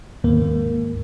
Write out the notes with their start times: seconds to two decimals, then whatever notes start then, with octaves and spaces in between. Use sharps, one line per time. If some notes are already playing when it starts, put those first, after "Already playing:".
0.24 D#2 G#2 A#3